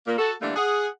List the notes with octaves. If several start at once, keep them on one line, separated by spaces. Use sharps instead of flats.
A#2 A#3
F#4 A4
D3 E3 G3 A3 A#3 D4
G#4 F#5